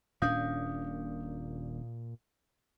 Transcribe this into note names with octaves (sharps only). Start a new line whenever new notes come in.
D#1 A#2 C#4 D4 F5 D#6 G6